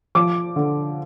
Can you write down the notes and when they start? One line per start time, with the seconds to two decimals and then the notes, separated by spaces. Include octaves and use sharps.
0.15 F3 D6
0.56 D3